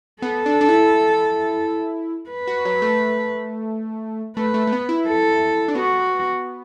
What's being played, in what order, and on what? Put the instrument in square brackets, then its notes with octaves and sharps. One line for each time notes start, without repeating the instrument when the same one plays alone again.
[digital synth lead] B3 [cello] A4
[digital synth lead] D4
D4
E4
[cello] B4
[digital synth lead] F#4
F#3
A3
[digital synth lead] A3 [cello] B4
[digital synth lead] A3
A3
B3
E4
[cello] A4
[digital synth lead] D4
[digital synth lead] B3 [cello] F#4